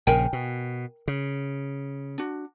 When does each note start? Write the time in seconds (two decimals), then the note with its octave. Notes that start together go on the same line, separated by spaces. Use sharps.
0.07 A#1 C#3 A#4 G5 G#5
0.33 B2
1.08 C#3
2.18 D4 F#4